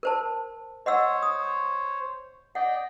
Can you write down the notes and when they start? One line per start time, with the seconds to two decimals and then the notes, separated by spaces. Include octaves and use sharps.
0.03 A#4 C5 A5
0.86 C5 C#5 D#5 F#5 E6
1.22 D#6
2.55 D5 D#5 F#5 G5